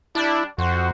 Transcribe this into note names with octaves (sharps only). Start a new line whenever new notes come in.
G3 D4 E4
F2 F#4 C5